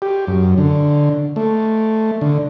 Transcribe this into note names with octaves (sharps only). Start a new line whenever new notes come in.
G4
F#2
D3
A3
D3